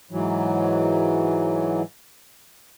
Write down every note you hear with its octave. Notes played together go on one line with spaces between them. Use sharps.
G#2 E3 F#3